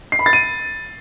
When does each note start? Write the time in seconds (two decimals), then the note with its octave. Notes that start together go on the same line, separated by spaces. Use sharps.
0.12 C7
0.19 B5
0.26 A6
0.33 D#7